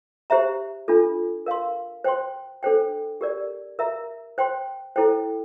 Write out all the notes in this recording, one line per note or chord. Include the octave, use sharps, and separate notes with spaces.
G4 C5 E5 A#5
D4 F4 A4
A#4 F5 C6
C5 G5 C6
D4 A4 C5 G5
G4 A#4 D5
A#4 E5 A#5
C5 G5 C6
E4 A4 C5 G5